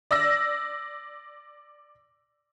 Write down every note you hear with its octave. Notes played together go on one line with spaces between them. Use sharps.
D5 E6 A#6